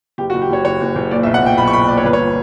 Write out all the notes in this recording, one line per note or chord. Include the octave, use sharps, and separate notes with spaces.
F#1 G4
F#4
F#1
G4
F#1 C#5
F#1 C#5
F#1
F#1
A#2 D5
E5
B1
F#5
A#2 G5
B1 B5
C#6
B1 B5
A#2 D5
C#5
G1 B4
C#5